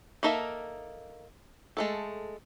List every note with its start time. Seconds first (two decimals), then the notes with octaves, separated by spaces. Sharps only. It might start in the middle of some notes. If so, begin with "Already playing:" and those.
0.23 A#3 D#4 A4 A#4 E5
1.77 G#3 A3 A4